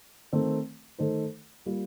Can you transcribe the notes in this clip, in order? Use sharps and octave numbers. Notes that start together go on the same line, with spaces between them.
D#3 A3 C4
D#3 A3 D#4 A4 C5
G3 A#3 F4